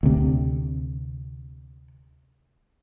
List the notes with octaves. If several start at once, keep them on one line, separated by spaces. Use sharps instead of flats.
D2 C3